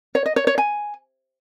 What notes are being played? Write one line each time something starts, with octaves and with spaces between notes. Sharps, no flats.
C#5
D#5
C#5
C#5
G#5